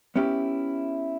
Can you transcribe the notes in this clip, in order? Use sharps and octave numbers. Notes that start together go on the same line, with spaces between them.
B3 C#4 E4 G4